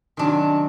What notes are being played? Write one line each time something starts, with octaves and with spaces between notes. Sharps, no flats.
C3 D#3 F#3 C#4 D4